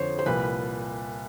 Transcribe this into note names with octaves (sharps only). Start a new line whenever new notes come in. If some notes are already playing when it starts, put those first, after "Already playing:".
Already playing: F2 D3 F3 C5 C#5
C5
C2 A#2 F3 B4